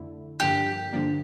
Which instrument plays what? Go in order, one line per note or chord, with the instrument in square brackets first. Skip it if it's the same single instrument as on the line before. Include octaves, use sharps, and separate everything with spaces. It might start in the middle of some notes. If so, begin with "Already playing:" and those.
Already playing: [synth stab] F2 D3 A3 E4
[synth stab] G2 D3 F3 A#3 D4 [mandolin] G4
[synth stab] G2 D3 F3 A#3 D4